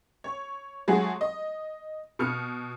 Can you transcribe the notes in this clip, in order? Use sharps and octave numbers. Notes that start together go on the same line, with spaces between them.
C#5
F#3 G#3 A3 F#4 G#4
D#5
B2 F6 C#7